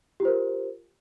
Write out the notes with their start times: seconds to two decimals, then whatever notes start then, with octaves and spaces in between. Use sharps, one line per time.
0.20 G4
0.22 F4
0.25 C5
0.28 A#4